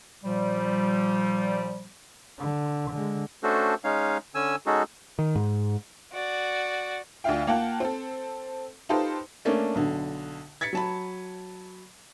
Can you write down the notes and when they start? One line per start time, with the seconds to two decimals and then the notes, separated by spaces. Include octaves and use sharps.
0.24 A#2 F3 G3
2.38 D3
2.91 D3 G#3
3.43 A3 C#4 D4 F#4 A4 C5
3.84 G#3 C#4 D#4 C#5 F5
4.35 D3 C#4 G#5 E6
4.66 G#3 C#4 D#4 F#4 G#4 A4
5.19 D#3
5.36 G#2
6.13 F#4 D5
7.24 D2 D4 F4 E5 F5 G5
7.47 A#3 F4 F#5 G5 A5
7.80 C4 A4
8.89 D#4 F4 G4 A4 B4 C5
9.45 A3 A#3 C#4 D4
9.75 B1 D3
10.61 G#6 A6 B6 C#7
10.73 F#3 A5 B5